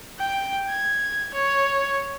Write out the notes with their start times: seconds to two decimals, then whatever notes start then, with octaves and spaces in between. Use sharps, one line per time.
0.19 G5
0.69 G#6
1.34 C#5